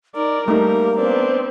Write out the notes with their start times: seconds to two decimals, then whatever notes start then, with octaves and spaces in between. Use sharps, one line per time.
0.15 D#4 A#4 D5
0.48 G3 A3 A#3 D#4
0.97 B3 C4 D4